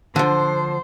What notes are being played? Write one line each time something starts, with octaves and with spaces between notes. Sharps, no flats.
D3 F3 C5